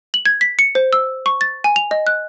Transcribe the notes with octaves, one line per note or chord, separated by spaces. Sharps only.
F#7
G#6
B6
C#7
C5
E6
C#6
A6
G#5
F7
D#5
F#6